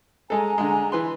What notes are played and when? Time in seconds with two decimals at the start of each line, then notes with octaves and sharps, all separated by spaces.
0.30 G#3 A4 G#5 A#5
0.58 D3 G#3
0.92 E3 B4 C6